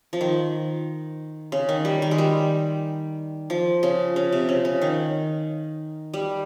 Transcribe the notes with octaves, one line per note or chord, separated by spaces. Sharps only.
F3
D#3
C#3
D#3
G3
D#3
G#3
G3
F3
C#3
C#3
C3
C#3
C#3
D#3
G3